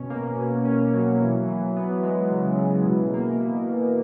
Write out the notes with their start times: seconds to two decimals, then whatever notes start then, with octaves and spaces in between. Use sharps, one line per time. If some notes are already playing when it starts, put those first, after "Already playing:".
Already playing: B2 C#4
0.10 A#3
0.38 B2
0.65 C#4
0.93 F#3
1.20 E3
1.48 E3
1.76 B3
2.03 G#3
2.31 C#3
2.59 E3
2.86 B2
3.14 A#3
3.40 B2
3.69 B2